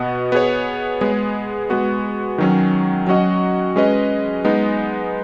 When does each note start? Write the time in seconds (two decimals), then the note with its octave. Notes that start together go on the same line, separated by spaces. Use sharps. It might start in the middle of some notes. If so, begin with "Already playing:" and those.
Already playing: B2 B3 F#4 D#5
0.32 B3 G#4 C#5
1.01 G#3 B3 G#4
1.70 G#3 B3 F#4
2.38 D#3 F#3 C#4
3.07 F#3 C#4 F#4 D#5
3.76 G#3 C#4 B4 D#5
4.45 G#3 B3 D#4